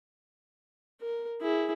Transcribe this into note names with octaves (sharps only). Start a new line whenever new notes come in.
A#4
E4 G#4